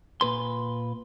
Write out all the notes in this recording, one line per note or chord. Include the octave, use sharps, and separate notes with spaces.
A#2 B4 C6